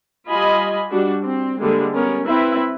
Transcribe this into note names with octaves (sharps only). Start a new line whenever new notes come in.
G3 F4 D#5 G#5 B5
G3 D4 F#4
C4
D3 G3 G#3 A#3
B3 C#4 A#4
C4 E4 B4 E5